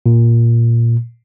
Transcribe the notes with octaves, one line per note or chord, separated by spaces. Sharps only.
A#2